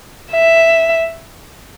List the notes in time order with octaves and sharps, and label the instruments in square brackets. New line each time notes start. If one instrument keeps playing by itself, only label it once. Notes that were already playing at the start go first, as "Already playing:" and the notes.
[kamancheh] E5